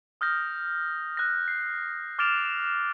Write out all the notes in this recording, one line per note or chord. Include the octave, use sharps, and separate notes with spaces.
D#6 F6 G6 A#6
F#6 A#6
C7
D6 F6 A6 D7 E7 F7